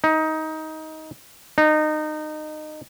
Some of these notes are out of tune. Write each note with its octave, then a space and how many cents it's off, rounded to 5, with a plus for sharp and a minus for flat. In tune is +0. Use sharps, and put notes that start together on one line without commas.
D#4 +15
D#4 -25